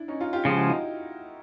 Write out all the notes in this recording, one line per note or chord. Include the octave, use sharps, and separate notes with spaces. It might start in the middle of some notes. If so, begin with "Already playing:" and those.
Already playing: D4 E4
C#4 D#4
D#4 F4
F4 G4
C#3 F3 G#3 F4 G4
E4 F#4
D#4 F4